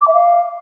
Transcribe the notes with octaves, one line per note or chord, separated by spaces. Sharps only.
D6
E5
F5